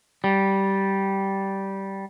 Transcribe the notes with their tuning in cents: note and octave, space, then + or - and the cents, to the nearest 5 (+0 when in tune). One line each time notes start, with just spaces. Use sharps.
G3 -10